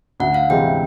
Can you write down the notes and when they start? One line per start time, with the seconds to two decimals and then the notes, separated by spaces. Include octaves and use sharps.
0.20 D2 F#5
0.34 F5
0.50 C3 E3 G#3 C4 G5